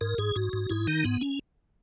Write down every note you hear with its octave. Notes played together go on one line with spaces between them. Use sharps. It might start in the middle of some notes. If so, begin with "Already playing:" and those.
G#2 A#4
G#2 G#4
G#2 F#4
G#2
G#2 E4
D#3 D#4
G#2 B3
C#4